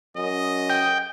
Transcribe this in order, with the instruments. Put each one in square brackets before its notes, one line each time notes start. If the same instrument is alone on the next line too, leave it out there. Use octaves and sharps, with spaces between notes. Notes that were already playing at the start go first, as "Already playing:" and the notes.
[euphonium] F#2 [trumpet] D#5
[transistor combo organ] G5